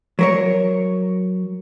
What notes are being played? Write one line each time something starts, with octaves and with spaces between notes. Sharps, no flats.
F#3 A#4 C#5